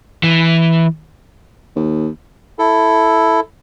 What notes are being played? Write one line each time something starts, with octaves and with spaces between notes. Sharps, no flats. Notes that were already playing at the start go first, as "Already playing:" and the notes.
E3
D#2
E4 A4